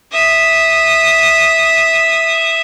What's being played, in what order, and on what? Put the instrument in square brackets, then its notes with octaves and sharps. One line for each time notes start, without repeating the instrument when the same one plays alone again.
[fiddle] E5 D#6